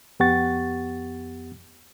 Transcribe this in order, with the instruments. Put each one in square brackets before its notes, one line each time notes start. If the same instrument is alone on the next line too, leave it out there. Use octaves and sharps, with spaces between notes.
[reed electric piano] F2 B3 G4 F#5 C#6 A6